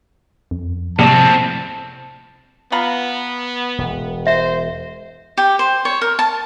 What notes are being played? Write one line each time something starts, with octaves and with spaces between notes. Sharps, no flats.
F2
A#1 A2 C3 C4 D5 A5 C#6
B3 F4 A#5 B5
E1
C5 E5
G4
C5
C#5
A#4
A5